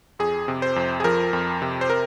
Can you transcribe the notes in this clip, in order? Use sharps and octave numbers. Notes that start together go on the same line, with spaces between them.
F2 G#4
C3
C5
F2
G#4
F3 A#4
F2
C3
C5
A#4